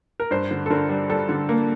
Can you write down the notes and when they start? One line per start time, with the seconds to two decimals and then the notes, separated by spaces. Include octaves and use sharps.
0.20 A#4
0.31 G2 C5
0.51 D3
0.66 A4
0.70 D3 A#4
0.89 G3
1.10 G3 A4
1.29 D3
1.49 A#3